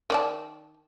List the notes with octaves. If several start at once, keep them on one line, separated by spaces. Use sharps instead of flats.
D#3 D5 A5